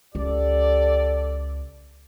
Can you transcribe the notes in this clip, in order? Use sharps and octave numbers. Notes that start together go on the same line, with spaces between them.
C#2 G4 A4 D5